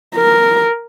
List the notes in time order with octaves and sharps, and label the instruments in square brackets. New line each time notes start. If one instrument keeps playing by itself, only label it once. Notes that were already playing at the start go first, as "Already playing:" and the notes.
[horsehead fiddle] A#4